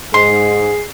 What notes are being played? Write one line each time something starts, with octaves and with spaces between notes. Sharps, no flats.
G#2 G#4 C6 C7